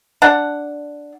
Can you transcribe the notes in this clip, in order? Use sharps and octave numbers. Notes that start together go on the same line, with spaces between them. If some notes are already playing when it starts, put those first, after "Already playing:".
D4 F#5